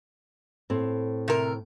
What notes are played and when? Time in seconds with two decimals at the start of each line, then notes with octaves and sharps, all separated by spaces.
0.70 A2 C4
1.28 C3 A#4